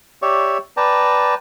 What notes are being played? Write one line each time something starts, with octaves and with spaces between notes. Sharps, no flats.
G4 C#5 D5 E5 C#6
B4 D5 G5 A5 A#5